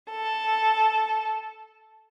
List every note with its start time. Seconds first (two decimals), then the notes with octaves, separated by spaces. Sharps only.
0.09 A4